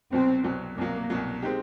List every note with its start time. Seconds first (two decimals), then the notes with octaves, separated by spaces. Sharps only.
0.12 C2 B2 F#3 C4
0.44 C2 B2 F#3
0.77 C2 B2 F#3 A#3
1.10 C2 B2 F#3
1.42 G#3 C4 D#4 G4